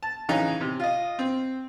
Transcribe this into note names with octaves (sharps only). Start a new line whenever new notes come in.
A5
C#3 E3 D#4
C3
F4 D#5
C4